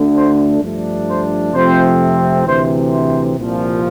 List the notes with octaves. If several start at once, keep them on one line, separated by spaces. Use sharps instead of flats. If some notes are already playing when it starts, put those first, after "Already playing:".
Already playing: D2 D3 A3 D4
C5
G2 F3 A3 D4
C5
F2 C3 F3 A3 C4 C5
D2 C3 E3 C5
C5
C2 A#2 F3